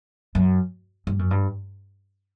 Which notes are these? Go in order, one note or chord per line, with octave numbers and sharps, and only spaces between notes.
F#2
G2
F#2
G2